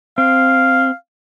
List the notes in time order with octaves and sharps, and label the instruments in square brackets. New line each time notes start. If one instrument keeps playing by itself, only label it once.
[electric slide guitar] C4 [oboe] F5